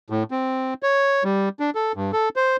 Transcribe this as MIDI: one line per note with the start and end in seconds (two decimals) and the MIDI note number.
0.10 0.23 45
0.31 0.74 60
0.83 1.23 73
1.24 1.49 55
1.60 1.70 62
1.75 1.92 69
1.95 2.11 43
2.13 2.29 69
2.36 2.57 72